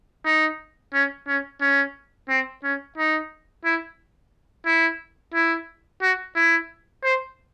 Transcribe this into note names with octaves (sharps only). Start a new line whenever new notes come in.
D#4
C#4
C#4
C#4
C4
C#4
D#4
E4
E4
E4
F#4
E4
C5